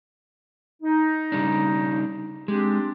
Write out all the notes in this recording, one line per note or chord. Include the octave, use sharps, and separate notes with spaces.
D#4
C#3 G3 D4
G#3 C4 D4 G4